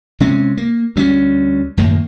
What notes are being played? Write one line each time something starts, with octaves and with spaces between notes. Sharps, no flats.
C3 G#3 C4 C#4
A#3
D2 G3 B3 C#4
F#2 A2 D#3 A#3